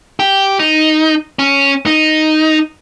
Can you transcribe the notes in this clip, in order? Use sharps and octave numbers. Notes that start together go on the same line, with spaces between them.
G4
D#4
C#4
D#4